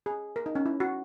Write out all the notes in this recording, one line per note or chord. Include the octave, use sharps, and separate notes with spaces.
G#4
A#4
D#4
C#4
E4
F#4